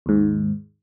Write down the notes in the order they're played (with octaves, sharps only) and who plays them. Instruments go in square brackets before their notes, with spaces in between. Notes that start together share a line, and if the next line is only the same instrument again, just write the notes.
[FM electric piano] D#2 G#2